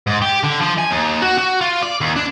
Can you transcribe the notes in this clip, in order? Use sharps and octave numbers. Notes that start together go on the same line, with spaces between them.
G#2
G4
D3
F3
G#5
D#2
F#4
F#4
F4
D5
D#2
D4